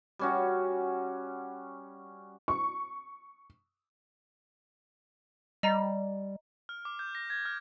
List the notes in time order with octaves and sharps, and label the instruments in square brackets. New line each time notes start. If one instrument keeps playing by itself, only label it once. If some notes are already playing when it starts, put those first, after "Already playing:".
[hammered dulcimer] G3 C#4 F#4
[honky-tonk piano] C#6
[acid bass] G3 [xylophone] D#5 A#5
[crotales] F6
D6
G6
A#6
G#6
F6